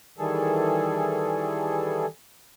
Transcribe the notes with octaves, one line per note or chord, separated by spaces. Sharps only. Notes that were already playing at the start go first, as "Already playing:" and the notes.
D#3 E3 G3 G#4 A4